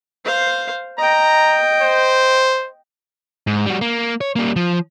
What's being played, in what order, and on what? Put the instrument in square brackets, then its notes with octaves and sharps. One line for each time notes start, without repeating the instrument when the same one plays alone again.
[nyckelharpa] C5 F5
[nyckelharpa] D#5 G5 [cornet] A#5
[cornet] C5
[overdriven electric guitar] G#2
G3 F#4
A#3
C#5
G3 A#3
F3